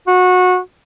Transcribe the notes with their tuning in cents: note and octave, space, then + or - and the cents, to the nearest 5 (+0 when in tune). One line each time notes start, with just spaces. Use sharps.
F#4 -20